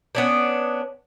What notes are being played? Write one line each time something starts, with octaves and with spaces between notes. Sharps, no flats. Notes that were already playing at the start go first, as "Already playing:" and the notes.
B3 C#4 D4